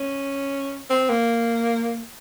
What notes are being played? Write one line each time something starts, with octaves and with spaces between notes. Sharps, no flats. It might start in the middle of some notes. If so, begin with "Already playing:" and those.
Already playing: C#4
C4
A#3